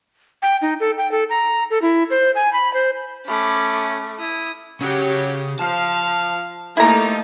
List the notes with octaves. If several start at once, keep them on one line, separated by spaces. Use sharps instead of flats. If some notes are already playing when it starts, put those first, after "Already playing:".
G5
D#4
A4
G5
A4
A#5
A4
E4
C5
G#5
B5
C5
A3 C#4 B5 D6
E4 D#6
C#3 F#3 C#4 G4
F3 F5 A5
F3 A3 A#3 D#4 E4 G4 A4 A#5